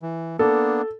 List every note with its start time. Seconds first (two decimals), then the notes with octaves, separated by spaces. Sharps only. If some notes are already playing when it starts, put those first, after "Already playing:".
0.02 E3
0.39 A#3 B3 D4 A4